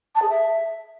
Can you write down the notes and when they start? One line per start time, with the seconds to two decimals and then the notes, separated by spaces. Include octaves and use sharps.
0.15 A5
0.22 G#4
0.29 E5